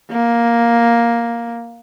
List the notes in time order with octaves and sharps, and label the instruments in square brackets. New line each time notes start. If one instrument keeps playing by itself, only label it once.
[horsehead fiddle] A#3